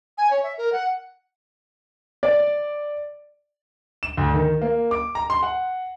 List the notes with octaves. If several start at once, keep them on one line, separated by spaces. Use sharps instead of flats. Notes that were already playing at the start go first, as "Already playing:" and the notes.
G#5
C#5
E5
A#4
F#5
D5
E7
D2
D#3
A#3
D6
A#5
C6
F#5